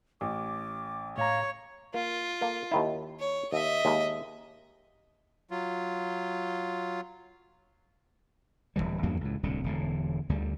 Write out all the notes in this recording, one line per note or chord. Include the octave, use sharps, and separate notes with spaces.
A1 D6
A2 C#5 F5 A#5
A#3 F4
A#3 A4 A#4
D#2 D#3 E4
C#5
D#2 D#5 E5
D#2 G#3 A#3
F#3 F4
D1 C#2 E3 G3
E2 G2 F#3 A#3
C#2 A2
D1 C2 D3
E1 A2 D3
D2 D3 G3